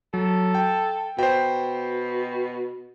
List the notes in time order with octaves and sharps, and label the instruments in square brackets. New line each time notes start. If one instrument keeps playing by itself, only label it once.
[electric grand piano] F#3 [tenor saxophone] A4
[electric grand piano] G5
[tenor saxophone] B2 [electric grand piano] C5 G5